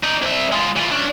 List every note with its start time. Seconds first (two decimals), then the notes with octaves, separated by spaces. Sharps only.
0.04 D#4 D5
0.22 C2 E5
0.52 G#3 F4
0.76 E3 F4
0.91 C#4 D4